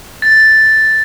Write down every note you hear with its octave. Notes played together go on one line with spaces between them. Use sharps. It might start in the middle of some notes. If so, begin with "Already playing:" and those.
A6